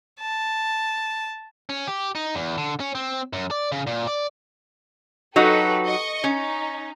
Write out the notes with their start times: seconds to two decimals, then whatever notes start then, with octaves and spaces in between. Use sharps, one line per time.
0.20 A5
1.69 C#4
1.87 G4
2.15 D#4
2.35 E2
2.58 D3
2.80 C#4
2.95 C4
3.33 F#2
3.51 D5
3.72 C#3
3.87 A#2
4.07 D5
5.36 F#3 D#4 F#4 G4 A4 B4
5.86 D#5 C#6
6.24 C#4 D#4